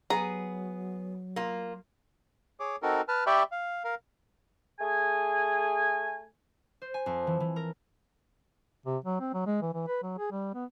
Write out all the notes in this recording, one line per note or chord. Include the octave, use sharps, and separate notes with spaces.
F#3 B3 G#4 A#5
A#3 F4
G#4 C#5 D6
C4 D#4 F#4 A4 A#4
B4 A5 F6
G4 D5 E5 G5 B5 C#6
F5
A#4 F5
A3 G#4 G#5
C5
G#5
F2
E3
E3
A#4
C3
F#3
C4
F#3
G#3
E3
E3
B4
F#3
G#4
G3
B3